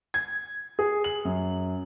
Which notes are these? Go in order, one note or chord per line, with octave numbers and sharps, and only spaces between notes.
G#6
G#4
F#7
F#2